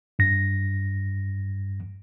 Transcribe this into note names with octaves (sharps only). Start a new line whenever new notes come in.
G2 A#6